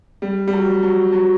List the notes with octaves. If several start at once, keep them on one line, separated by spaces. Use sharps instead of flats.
G3
G3
F#3
F#3
F#3